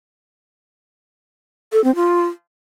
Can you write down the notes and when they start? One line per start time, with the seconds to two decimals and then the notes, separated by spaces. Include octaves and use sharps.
1.73 A4
1.84 C4
1.96 F4